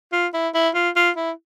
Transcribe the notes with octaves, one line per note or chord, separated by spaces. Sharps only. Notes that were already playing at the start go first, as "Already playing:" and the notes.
F4
E4
E4
F4
F4
E4